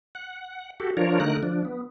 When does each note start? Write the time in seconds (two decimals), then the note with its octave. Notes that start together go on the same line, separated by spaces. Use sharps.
0.15 F#5
0.80 F#4 G4 A4
0.97 F3 D4 F4 A#4 C#5
1.20 D3 A3 D#4 A#4 F#6
1.43 F3 D4
1.65 B3